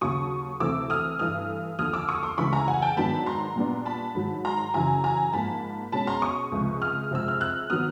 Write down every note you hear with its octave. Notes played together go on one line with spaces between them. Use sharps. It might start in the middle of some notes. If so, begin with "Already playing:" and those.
D#2 C#3 F#3 C#6 D#6
D2 C3 E3 A3 C4 D6 E6
D#6 F6
G2 E3 A3 D#6 F6
D#2 D3 F3 D#6 F6
D6 E6
C#6 D#6
C6 D6
D2 C#3 E3 G#3 B5 C#6
G#5 A#5
F#5 G#5
G5 A5
G#2 D#3 F#3 B3 D4 A5 B5
A#5 C6
A#2 G3 B3 D4
A5 B5
G#2 D#3 F#3
A#5 C6
F#2 C#3 E3 G#5 A#5
G#5 A#5
G#2 F3 A#3 A5 B5
B2 G#3 C#4 A5 B5
A#5 C6
C#6 D#6
C#2 C3 F3 G#3
D#6 F6
C3 F3 G#3 C4 E6
F6
E6 F#6
D#3 F#3 B3 D#6 F6